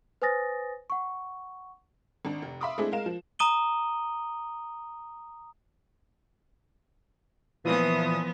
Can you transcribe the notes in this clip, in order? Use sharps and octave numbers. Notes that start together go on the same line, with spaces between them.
B4 C5 G#5 D#6 A6 A#6
F#5 C#6
G#1 D4
F1
E5 F5 B5 C6 D6 D#6
G#3 A3 C4 D4 E4 G#4
G#3 A#4 F5 E7
F3
A#5 D#6 D#7 G7
A#2 E3 F3 B3 D#6